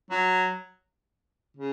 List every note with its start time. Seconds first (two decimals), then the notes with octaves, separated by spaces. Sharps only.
0.11 F#3
1.57 C#3